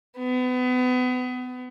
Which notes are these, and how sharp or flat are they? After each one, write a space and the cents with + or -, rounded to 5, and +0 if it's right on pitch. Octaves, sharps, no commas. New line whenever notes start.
B3 +30